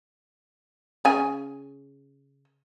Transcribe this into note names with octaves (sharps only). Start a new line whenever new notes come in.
C#3 G#5